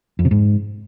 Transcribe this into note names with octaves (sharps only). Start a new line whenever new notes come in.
F2
C3
G#2